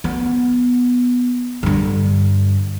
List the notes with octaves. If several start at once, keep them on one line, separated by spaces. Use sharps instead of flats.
B3
G2 D3